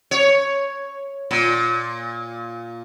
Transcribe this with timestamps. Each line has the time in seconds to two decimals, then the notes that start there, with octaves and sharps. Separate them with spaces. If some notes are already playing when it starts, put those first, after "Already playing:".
0.11 C#5
1.31 A#2